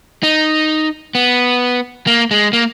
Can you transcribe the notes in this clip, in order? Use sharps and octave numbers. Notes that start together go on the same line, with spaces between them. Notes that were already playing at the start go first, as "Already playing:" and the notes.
D#4
B3
A#3
G#3
A#3